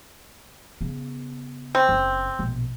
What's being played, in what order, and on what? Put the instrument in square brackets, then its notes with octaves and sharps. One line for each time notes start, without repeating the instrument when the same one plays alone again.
[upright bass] C#3 B3
[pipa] C4
[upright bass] F#1
A#1 B2